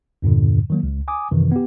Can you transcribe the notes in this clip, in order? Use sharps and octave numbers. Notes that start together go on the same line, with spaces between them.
E2 G2 A#2 D3
D#3 F#3 A#3
C#2
G#5 D6 D#6
F#2 C3 D#3 E3
B3 G4